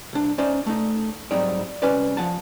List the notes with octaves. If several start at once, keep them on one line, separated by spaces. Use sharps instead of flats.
C2 D4
C#4 D#4 C5 D5 E5
A3 D#4
G#2 F#3 G3 C4 D#4 D5
C2 C#4 B4 D5
F3 F#5 A5